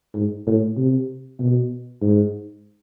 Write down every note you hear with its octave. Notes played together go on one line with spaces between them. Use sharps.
G#2
A2
C3
B2
G#2